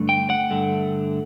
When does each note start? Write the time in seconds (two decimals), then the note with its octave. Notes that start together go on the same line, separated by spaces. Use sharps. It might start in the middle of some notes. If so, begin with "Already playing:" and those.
Already playing: G2 D3 A3
0.09 G5
0.30 F#5
0.51 G2 D3 A3